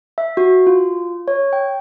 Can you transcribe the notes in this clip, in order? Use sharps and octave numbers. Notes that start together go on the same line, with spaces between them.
E5
F#4
F4
C#5
G5